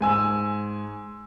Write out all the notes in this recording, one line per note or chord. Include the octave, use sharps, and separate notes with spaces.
G#2 G#5 E6